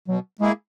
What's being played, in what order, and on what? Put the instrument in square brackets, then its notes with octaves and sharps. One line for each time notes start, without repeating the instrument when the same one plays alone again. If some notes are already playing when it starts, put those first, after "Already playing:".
[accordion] B2 [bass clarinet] F#3
[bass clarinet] G#3 [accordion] A#3 E4 G#4